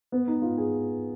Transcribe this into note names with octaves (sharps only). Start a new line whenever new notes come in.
B3
D#4
F4
G#4